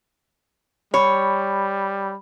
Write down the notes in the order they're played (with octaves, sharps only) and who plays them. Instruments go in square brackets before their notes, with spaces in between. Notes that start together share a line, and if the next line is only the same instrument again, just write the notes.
[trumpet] G3 [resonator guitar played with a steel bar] C#5 [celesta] B5